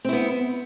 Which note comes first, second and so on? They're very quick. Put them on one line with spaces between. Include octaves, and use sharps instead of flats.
C4 E4 B3